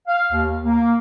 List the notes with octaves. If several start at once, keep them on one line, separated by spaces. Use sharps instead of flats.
F5
D#2
A#3